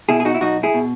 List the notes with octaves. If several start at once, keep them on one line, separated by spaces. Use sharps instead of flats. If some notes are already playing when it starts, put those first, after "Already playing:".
B2 E4 G#4
G#4
D#4 F#4
E4
B1 D#4 F#4
E4 G#4
B2